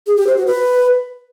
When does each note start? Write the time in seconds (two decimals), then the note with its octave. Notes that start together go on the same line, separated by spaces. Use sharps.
0.07 G#4
0.17 G4
0.27 C5
0.37 F#4
0.47 B4